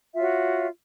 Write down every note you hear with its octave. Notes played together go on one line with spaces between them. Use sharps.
F4 F#4 C#5 E5